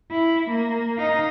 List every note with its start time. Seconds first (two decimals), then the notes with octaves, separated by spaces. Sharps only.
0.11 E4
0.50 A#3
0.98 D#4 F5